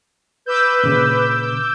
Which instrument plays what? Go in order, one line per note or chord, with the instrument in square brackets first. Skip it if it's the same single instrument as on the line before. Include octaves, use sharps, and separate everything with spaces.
[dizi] B4 [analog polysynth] D6 E6 G6
[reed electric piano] A#2 C#3